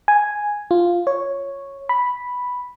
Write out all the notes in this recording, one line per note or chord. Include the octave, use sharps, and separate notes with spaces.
G#5
F4
C#5
B5